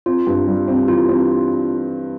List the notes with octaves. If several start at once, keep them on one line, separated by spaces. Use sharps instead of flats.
C4 F4
G2
G3
C4
E3 F4
C4